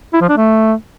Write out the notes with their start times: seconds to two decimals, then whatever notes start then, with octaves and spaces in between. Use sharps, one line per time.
0.14 E4
0.21 F3
0.29 D4
0.37 A3